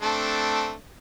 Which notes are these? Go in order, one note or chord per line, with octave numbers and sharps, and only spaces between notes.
A3 C4 D4